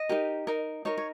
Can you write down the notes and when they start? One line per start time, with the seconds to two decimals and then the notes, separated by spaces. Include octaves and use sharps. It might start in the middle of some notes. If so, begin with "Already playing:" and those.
Already playing: D#5
0.09 D#4 G4 A#4
0.47 D#4 A#4
0.85 D#4 A#4 C#5
0.97 C#5